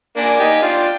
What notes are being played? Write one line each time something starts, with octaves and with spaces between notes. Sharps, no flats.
A#3 D4 G#5
D#4 G4
D4 F4 G5